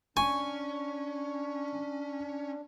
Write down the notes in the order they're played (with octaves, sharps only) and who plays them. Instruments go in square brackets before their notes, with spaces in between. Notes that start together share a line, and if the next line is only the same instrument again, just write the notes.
[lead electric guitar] C#4 [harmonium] D4 [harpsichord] G#5 [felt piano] C#6